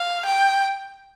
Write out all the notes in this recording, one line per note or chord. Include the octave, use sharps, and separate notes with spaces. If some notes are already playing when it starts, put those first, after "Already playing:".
Already playing: F5
G5